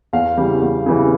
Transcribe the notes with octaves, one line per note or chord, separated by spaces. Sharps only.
E2 F5
C#3 E3 G3
E2
C#3 E3 G3